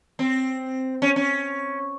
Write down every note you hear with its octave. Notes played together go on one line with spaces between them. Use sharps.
C4
C#4
C#4